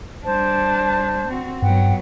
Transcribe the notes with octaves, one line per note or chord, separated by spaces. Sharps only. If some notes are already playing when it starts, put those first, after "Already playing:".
G3 D4 C5 A5
C4 F#4
G2 F#3 B3 F#5 G5